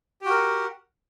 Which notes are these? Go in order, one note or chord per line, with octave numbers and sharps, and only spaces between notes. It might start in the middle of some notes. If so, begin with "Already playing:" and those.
F#4 G4 A#4 F#5